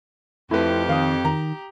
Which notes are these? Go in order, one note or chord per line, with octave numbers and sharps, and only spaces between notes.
F2 A3 E4 G4 B4
D#3 F5 D#6
D#3 A#5